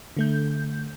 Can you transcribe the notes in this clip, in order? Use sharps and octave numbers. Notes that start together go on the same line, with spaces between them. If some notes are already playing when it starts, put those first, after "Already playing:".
D3 A3 G6